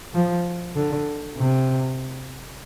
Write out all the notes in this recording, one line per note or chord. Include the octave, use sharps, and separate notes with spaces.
F3
D3
C3